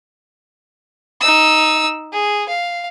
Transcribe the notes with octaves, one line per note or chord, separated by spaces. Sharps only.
D#4 E6
G#4
F5